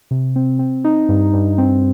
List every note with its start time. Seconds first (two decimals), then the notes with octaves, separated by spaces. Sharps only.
0.11 C3
0.36 C4
0.59 C4
0.84 D#4
1.09 G2
1.34 G2
1.58 C4